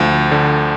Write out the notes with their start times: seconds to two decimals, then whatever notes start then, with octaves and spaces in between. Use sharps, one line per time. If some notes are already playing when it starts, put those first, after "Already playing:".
Already playing: D2 F3
0.31 D3